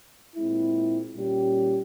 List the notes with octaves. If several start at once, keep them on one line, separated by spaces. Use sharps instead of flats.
A#2 G#3 C4 E4
A#2 G3 C#4 G4